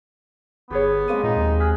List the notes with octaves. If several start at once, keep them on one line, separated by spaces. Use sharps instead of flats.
G1 B3 G4 G#4 C#5
G#3 A#3 C4 D#7
A#2 D#4
D#2
G#4 F6 F#6 B6